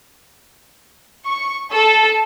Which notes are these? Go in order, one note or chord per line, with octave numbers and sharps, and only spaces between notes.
C#6
A4